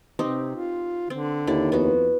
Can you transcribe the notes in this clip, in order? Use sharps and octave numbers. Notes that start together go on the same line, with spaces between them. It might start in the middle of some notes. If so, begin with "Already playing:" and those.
C3 C4 D#4 G4
F4
D3 C4
D#2 E4 D5
F2 B3 F#4